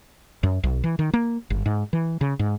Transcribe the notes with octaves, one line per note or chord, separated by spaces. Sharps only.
F#2
B1
E3
D#3
A#3
G1
G#2
E3
C#3
G#2